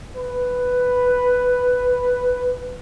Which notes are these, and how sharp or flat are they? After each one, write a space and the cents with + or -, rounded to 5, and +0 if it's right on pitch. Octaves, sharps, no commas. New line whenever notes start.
B4 +5